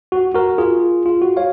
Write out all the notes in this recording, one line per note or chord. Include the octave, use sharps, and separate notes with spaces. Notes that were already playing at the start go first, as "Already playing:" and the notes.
F#4
F#4 A#4
F4 G#4
F4
F#4
C#5 F5